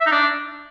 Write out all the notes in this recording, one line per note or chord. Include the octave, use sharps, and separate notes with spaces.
E5
D#4
D4